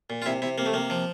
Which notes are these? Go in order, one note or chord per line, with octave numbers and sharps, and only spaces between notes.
A#2
F4
C3 E4
C3 E4
C3 A#3
A3
C3 A#3
F3